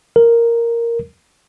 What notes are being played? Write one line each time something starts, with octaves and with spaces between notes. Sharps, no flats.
A#4